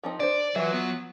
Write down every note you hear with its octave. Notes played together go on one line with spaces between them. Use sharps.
F3 C4 D#4
D4 C5 D5
E3 F#3 F4 E5
B3